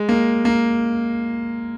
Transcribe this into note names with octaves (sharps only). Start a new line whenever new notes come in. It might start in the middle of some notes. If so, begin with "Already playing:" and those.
Already playing: G#3
A#3
A#3